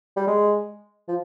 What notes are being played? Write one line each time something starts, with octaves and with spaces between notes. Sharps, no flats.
G3
G#3
F3